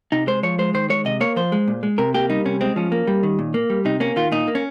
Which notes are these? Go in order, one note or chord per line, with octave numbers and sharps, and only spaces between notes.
C3 D#4
G#3 C5
F3 C#5
G#3 C5
D#3 C5
G#3 C#5
C3 D#5
A#3 C#5
F3 C5
G#3
A#2
G#3
C3 A#4
A#3 G4
G3 D#4
C3 C#4
G#3 C4
F3 C#4
A#3
G3
D#3
A#2
A#3
G3
C3 D#4
A#3 C#4
D#3 F4
A#2 D#4
A#3
C#4